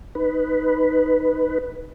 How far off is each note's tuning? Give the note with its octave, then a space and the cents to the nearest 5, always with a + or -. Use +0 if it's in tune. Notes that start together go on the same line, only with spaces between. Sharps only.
D#4 +0 B4 +5